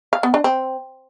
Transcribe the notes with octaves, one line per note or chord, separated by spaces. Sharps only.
F5
B3
D4
C4